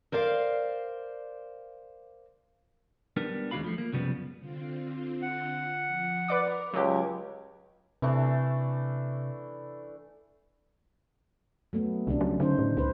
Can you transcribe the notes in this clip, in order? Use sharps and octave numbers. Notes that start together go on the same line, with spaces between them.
A#4 C5 D5 F5
G3 B3 D4 A#4
D#2 G#3 D4 F#4 F5 B5
F3 A3
A#3
C2 F#2 C#3 F3 G3 B3
D3 C4 F4
F#5
F3
A#4 B4 D5 D6
C#2 F#3 G4 D6 G#6
C3 E3 A3 D4
F#3 A3 B3
C2 C#3 G3 D4
F#3
D3 C#4 D#4 C5
A2
C#2 B4 C5